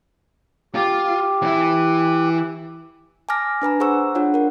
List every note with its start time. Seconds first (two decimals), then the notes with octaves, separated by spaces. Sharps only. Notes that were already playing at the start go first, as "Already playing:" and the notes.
0.75 F4 G4
1.43 E3 E4
3.29 G#5 A5 D6 F6 A#6
3.62 D4 B4 G#5 A#5
3.80 G#4 C5 F#5 A#5 C#6 E6
4.15 D4 F4 C#5 F#5
4.34 A#4 F#5